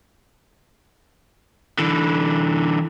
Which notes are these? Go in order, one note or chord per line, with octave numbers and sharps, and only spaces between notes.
D3 E3